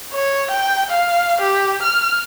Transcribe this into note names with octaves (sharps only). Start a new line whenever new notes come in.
C#5
G5
F5
G4
F6